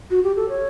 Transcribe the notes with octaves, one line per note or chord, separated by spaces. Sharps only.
F#4
G4
A4
C#5